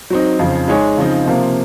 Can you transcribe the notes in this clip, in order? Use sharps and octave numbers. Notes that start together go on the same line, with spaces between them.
F#3 C4 D#4
F2 C#3 F3
G#3 D#4 G#4 C#5
C#3 F3 C4 D#4
C3 F3 A#3